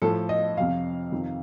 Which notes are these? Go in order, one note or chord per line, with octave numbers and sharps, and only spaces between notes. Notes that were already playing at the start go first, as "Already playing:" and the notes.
A2 F3 A4
D#5
F2 C3 F3 F5
F2 C3 D#3